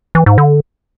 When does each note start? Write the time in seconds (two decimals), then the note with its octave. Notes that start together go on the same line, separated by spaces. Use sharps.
0.15 E3
0.26 G#2
0.38 D3